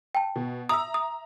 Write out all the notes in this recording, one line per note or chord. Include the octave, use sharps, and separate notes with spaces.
G5 A5
B2
E5 A#5 D#6 E6
D#6